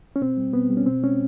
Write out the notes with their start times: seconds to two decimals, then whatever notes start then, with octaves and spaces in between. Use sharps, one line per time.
0.16 C#4
0.21 B2 C4
0.37 G3
0.53 B2 B3
0.70 G3
0.77 C#4
0.86 B2 C4
1.02 G#3 C#4